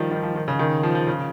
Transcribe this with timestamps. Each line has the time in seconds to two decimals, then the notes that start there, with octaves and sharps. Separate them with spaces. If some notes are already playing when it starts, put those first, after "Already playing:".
Already playing: D#3 F3 G3
0.11 D#3
0.23 F3
0.35 D#3
0.48 C#3
0.59 D#3
0.83 F3
0.95 F3
1.07 C#3